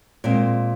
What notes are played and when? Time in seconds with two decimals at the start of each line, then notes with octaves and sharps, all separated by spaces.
0.24 A#2 G#3 C4